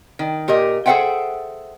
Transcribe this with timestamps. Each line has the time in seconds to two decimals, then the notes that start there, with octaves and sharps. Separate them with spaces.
0.19 D#3
0.48 A#2 G4 A#4 D#5
0.86 G#4 A4 C5 E5 F#5 G5